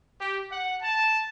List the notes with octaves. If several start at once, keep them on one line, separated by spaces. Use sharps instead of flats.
G4
F#5
A5